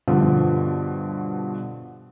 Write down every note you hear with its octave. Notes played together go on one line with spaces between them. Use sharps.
G2 B2 D3 F3